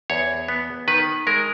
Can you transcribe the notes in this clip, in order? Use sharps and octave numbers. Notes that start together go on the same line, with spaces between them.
E2 C#5
B3
D#3 B4
G#3 A#4